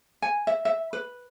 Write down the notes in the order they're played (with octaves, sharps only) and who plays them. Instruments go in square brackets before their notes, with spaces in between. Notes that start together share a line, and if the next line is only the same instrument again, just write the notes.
[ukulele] G#5
E5
E5
B4